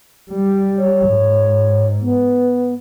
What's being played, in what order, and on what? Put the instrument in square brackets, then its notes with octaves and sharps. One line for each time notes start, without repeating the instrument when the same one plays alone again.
[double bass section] G3
[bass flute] C#5
[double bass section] G#2
[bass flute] B3